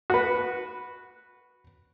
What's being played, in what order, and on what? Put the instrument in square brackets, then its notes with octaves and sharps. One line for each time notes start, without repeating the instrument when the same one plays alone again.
[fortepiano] F#4 B4